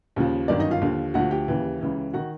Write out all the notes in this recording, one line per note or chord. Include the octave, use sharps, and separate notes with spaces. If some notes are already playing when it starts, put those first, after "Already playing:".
D#2 C#3 F3
G1 F#2 D#3 D4 D5
D#4 D#5
F4 F5
D#2 D3 F3
D2 D3 F3 F#4 F#5
G4 G5
D#2 C#3 E3
C#2 C#3 E3
D#3 F#4 F#5